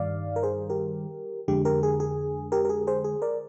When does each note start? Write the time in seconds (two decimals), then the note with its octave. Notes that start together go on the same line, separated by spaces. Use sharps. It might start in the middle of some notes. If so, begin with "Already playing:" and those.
Already playing: G2 D#3 G3 D5 F5
0.36 A#4
0.43 G#4 C5
0.70 G4 A#4
1.48 F2 D3 G#3 G4
1.65 G4 A#4
1.83 G#4
2.00 G#4
2.52 G4 A#4
2.65 A#4
2.69 G#4
2.87 G#4 C5
3.04 G#4
3.22 A#4 D5